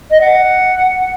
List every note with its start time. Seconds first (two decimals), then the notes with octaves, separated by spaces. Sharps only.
0.10 D#5
0.20 F#5